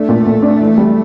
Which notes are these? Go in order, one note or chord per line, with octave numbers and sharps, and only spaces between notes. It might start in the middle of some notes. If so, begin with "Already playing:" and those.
Already playing: A3 D4
A#2
A#2
D4
E3
G3